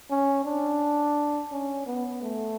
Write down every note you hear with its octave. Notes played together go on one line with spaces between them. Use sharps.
C#4
D4
C#4
B3
A3